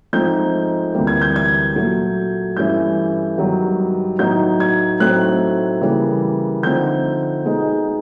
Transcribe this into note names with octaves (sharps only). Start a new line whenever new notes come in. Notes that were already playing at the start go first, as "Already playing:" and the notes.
G#2 F3 A3 C4 D#4 G6
D2 C3 E3 G3 A#3
G#6
G6
G#6
A#2 F#3 A3
G2 E3 A3 C#4 E4 G6
G2 D#3 F#3 B3
A2 F#3 B3 D#4 G6
G#6
A2 F#3 A3 C4 D#4 F#6
C#3 E3 G3 A#3
D3 F3 A3 C4 D#4 G6
B2 G#3 B3 D#4